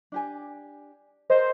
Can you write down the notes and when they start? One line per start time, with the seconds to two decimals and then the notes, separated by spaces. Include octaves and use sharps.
0.12 D4 G4 G#5
1.30 G#4 A#4 C5 D#5